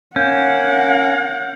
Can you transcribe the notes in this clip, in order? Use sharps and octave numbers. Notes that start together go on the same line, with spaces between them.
A#3 C#4 F#5 G6